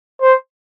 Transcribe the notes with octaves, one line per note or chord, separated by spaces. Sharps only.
C5